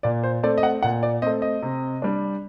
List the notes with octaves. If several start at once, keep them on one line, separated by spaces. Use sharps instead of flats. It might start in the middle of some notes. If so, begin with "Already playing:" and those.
A#2 D5
C5
A3 C4 D5
D#5
F#5
A#2 F#5
D5
A3 C4 D#5
D#5
C3
G3 D4